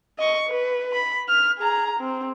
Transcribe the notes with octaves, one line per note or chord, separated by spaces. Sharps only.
D#5 C#6
B4
B5
F6
G#4 A#5
C4